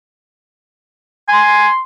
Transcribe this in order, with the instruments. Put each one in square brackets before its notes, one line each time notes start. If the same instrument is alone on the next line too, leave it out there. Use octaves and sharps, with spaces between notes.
[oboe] G#5 [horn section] C6